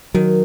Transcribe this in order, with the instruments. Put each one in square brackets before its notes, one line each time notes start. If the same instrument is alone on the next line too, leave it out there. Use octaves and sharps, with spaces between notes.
[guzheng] D#3 [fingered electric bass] F#3